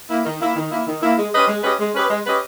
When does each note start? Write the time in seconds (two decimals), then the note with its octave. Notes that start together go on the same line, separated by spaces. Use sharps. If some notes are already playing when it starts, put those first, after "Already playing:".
0.10 A#3 E4
0.25 D#3
0.41 A#3 E4
0.56 D#3
0.71 A#3 E4
0.87 D#3
1.02 A#3 E4
1.18 G#3
1.32 C#4 G4 B4 D#5
1.48 G#3
1.64 C#4 G4 B4 D#5
1.80 G#3
1.94 C#4 G4 B4 D#5
2.10 G#3
2.26 C#4 G4 B4 D#5